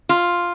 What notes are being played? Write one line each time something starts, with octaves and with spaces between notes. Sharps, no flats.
F4